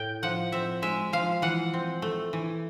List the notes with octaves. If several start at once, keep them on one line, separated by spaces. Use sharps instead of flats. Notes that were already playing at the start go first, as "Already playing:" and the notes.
Already playing: A2 G5
F3 F#5
C4 E5
G#3 E5
F3 F5
E3 F#5
C4
A3
E3